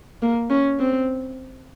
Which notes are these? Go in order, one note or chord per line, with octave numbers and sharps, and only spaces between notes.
A#3
C#4
C4